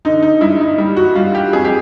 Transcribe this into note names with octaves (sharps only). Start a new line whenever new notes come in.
D3 D#4
D#4
G2 E4
D#4
G3
F#4
G3 F4
G4
F2 G#4
G4